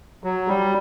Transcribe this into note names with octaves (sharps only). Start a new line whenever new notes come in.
F#3
G3